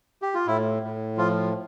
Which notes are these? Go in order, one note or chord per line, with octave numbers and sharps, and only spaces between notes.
G4
F4
A2 E4
A2
F3 F4